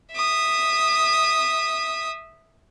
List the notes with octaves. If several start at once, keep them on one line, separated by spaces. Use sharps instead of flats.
E5 D#6